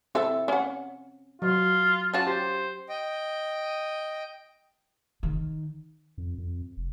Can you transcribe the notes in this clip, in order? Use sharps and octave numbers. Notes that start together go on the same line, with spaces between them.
C4 E4 A4 E5
C#4 F#5
F#3 F4
C#4 F4 F#4 A5
G4 C5
D#5 G5
D#3
F2
F2
F1